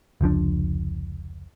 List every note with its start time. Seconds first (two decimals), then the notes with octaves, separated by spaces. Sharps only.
0.21 F1 C#2 F3 D4